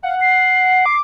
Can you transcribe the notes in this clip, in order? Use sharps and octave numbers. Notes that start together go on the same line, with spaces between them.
F5 F#5
C7
D6